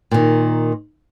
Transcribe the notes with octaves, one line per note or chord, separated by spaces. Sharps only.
A#2 D#3